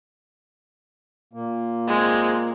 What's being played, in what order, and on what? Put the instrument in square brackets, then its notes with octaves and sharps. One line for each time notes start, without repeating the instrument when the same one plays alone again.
[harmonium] A#2 A#3
[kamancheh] G#3 C4